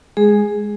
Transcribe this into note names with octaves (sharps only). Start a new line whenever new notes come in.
G#3 G#4